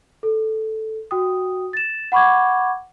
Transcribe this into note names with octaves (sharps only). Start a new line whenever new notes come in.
A4
F#4 G5 D#6
A6 E7
F#5 B5 C#6 D6 G#6